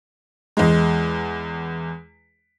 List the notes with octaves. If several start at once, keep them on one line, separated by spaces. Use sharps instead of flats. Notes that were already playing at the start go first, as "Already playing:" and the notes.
E2 G#3